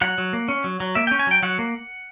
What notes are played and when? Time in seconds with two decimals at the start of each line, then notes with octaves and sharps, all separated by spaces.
0.01 F#3 F#5
0.18 F#3
0.33 A#3
0.48 C#4
0.64 F#3
0.80 F#3
0.95 A#3 E5
1.07 G5
1.11 C#4
1.19 G#5
1.27 F#3 G5
1.43 F#3 F#5
1.59 A#3